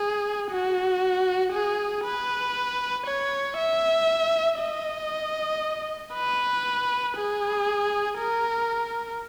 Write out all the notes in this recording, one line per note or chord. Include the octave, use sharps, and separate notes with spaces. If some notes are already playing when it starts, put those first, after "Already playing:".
Already playing: G#4
F#4
G#4
B4
C#5
E5
D#5
B4
G#4
A#4